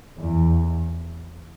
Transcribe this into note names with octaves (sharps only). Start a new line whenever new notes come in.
E2